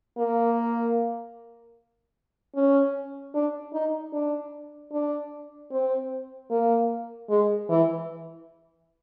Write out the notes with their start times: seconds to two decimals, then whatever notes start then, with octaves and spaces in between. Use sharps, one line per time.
0.18 A#3
2.55 C#4
3.34 D4
3.73 D#4
4.13 D4
4.92 D4
5.71 C4
6.51 A#3
7.30 G#3
7.69 E3